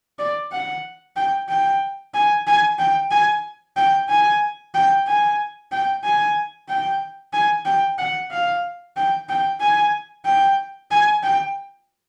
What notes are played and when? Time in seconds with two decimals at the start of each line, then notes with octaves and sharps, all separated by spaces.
0.19 D5
0.52 F#5
1.16 G5
1.49 G5
2.14 G#5
2.47 G#5
2.79 G5
3.11 G#5
3.77 G5
4.09 G#5
4.74 G5
5.07 G#5
5.72 G5
6.04 G#5
6.69 G5
7.33 G#5
7.65 G5
7.98 F#5
8.31 F5
8.96 G5
9.29 G5
9.61 G#5
10.25 G5
10.91 G#5
11.23 G5